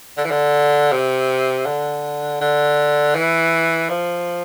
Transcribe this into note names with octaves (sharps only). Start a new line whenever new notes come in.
D3
E3
D3
C3
D3
D3
E3
F3